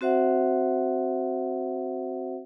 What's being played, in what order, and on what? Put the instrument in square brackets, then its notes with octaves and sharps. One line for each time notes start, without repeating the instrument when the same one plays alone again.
[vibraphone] C4 F#4 C5 E5 F#5